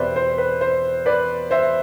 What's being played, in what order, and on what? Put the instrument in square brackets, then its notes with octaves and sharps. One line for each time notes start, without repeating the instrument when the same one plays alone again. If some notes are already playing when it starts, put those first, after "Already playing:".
Already playing: [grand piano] E2 B2 G3 C4 B4 C5 D5 E5
C5
B4
C5
B4 D5
C5 E5